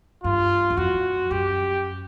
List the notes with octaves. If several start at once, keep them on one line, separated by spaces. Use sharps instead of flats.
G2 F4
E2
F2 F#4
F#2 G4